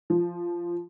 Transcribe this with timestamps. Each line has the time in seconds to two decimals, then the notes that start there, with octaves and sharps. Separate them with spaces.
0.10 F3